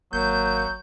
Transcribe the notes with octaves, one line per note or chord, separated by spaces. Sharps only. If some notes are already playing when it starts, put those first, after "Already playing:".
G#1 F#3 A#3 G6